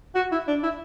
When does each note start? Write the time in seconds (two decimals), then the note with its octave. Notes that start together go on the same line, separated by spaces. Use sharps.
0.15 F#4
0.32 E4
0.48 D4
0.63 E4